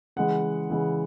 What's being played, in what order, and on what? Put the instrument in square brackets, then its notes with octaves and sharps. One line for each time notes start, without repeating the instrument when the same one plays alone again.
[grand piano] C#3 E3 G#3 F#5
C#3 E3 G#3